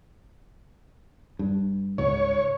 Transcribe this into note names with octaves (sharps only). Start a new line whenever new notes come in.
G2
C#2 G#2 C#5